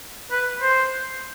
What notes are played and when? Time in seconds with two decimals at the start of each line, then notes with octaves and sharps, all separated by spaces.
0.31 B4
0.62 C5